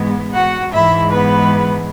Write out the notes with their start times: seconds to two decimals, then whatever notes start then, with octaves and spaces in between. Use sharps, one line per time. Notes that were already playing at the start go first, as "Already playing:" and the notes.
Already playing: G#2 E3 G#3 B3
0.34 F#4 F#5
0.73 G#2 E3 G#3 E4 E5
1.11 B3 B4